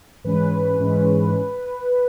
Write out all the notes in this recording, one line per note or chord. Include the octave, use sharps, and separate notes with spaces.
G#2 E3 G#3 C#4 B4
G#2 E3 G#3 C#4